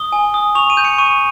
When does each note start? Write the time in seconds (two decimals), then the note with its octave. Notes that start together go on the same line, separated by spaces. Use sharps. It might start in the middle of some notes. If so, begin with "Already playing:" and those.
Already playing: D#6 G7
0.12 G#5
0.34 D#6
0.55 C#6 F7
0.70 D#7
0.77 G6
0.85 C#7
0.98 C#6 D#7